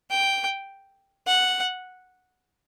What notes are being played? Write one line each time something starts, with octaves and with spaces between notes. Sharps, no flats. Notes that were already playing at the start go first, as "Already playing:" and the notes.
G5
F#5